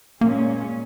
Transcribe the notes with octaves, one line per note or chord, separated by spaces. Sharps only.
A#2 G#3 A#3 C#4